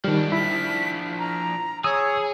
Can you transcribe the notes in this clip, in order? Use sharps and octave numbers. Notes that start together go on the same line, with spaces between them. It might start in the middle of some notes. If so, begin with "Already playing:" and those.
D#3 F3 G3 D4
E4 B6
A#5
G#4 C#5 D#6 E6